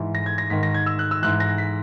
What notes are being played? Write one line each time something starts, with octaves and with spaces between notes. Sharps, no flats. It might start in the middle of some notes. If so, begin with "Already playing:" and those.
Already playing: G#2 E3
A#6
G#6
A#6
G#2 D#3 B6
A#6
G#6
E6
F#6
E6
G#2 E3 F#6
A#6
B6